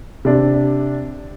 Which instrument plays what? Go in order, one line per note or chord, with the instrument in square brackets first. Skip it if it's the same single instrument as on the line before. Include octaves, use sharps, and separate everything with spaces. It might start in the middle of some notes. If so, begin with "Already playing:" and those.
[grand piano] C3 D4